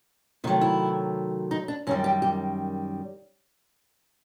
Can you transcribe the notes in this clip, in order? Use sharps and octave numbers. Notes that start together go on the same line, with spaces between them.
C3 D#3 F#3 A3 D#4
E4
D#4
D4
F#2 D#3 G3 C#4
G4
G4